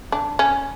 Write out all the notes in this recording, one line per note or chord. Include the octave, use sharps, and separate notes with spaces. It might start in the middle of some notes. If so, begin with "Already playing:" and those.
D4
C#4